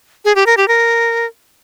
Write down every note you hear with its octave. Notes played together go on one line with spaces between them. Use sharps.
G#4
G4
A#4
G4
A#4